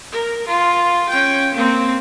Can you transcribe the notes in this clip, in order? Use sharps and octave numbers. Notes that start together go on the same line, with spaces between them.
A#4
F4
C#4 G5
A#3 C4